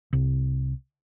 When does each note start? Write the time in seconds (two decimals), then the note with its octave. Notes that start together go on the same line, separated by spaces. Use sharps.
0.13 C2